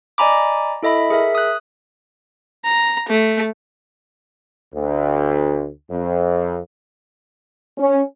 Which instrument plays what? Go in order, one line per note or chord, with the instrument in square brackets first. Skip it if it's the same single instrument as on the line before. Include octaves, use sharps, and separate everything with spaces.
[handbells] D5 D#5 G#5 A#5 B5 D6
E4 A4 D#5 E5 B5
G#4 A#4 E5
D#6 F#6
[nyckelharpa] A#5
A3
[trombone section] D2
F2
[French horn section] C#4